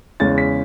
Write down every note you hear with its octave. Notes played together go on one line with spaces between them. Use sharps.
E2 C#3 G#3 C#4 A6
B6